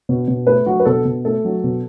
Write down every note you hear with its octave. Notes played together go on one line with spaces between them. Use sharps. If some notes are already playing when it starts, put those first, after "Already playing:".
B2
B2
A3 B4
F#3 F#4
B4
B2 A4
B2
A3 A4
F#3
B2